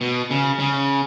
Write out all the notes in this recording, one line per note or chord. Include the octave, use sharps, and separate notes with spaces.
B2
C#3
C#3